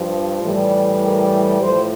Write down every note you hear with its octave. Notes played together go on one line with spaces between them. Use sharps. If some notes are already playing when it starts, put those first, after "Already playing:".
Already playing: G2 F3
A2 E3 G3
A#4
A2 F3 C5